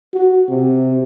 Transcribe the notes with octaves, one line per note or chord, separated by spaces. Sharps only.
F#4
C3